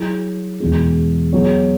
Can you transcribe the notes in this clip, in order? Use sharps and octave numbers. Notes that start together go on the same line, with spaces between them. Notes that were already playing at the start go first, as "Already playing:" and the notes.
Already playing: F#3 E4 G#4
E2 B2 G#3
F#3 B3 G#4 C#5